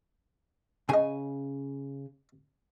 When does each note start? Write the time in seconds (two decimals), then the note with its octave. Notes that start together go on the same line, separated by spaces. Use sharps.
0.89 C#3 G#4 D#5 G#5